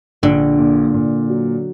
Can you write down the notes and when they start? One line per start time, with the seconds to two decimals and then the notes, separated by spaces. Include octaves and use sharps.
0.23 A#1 D3
0.58 A#2
0.94 A#2
1.29 F#3